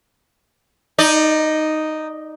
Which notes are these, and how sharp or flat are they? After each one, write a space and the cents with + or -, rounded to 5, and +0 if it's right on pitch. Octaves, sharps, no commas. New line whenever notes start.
D#4 +0 D5 +25